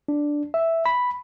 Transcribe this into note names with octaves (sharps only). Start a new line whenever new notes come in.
D4
E5
B5